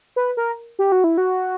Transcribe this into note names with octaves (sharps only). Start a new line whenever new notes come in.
B4
A#4
G4
F#4
E4
F#4